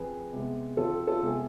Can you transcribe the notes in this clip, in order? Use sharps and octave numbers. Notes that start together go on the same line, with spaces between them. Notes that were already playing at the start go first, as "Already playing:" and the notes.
Already playing: F2 G#4 B4
C3 G#3 B3
F2 F4 A4
F4 A4
C3 G#3 B3 G#4